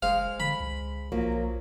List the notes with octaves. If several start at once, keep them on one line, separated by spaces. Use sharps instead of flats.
F#1 G#3 G#4 C5 F5
D3 B5
C#2
B1 F3 F#3 A#3